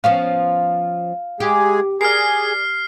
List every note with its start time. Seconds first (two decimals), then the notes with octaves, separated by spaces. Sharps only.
0.04 F3 B3 C#4 F4
1.40 G#3 G4 G#4
2.01 G#4 A#4 B4 D5 F6 C7